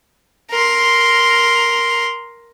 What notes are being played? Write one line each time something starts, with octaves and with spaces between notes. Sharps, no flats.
A#4 C6